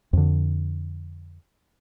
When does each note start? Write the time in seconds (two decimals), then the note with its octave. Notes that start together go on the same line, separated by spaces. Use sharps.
0.13 F2 D3